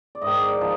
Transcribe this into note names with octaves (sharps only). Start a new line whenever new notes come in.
D5
G#2 D#3 D#5
D5
D5
F3 D#4